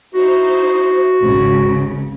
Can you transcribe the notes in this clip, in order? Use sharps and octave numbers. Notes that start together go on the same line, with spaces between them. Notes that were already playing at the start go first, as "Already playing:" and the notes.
D#4 E4 F#4 C5
G#1 C#2 C#3